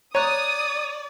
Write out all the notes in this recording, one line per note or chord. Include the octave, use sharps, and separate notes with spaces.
C#5 D5 A#5 D#6 F#6